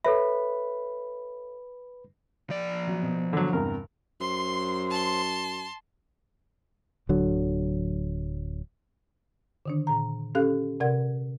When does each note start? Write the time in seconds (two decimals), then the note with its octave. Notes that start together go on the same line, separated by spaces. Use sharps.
0.05 A4 B4 C#5 E5 B5
2.50 F3 D5
2.87 F#3
3.03 B2
3.33 D3 F#3
3.53 E2 G2 C3 A#4
4.21 F#2 C5 C6
4.90 A5 C6
7.09 D1 D3 F#3
9.66 D3 D#3 D4
9.87 A#2 A#5
10.35 C#4 G4 A4 F5 F#6
10.80 C3 A#4 D5 F#5 G#6